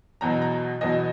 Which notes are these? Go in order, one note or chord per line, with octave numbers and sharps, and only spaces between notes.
E2 B2 F#3 A#5
A#5
E2 B2 F#3 D#5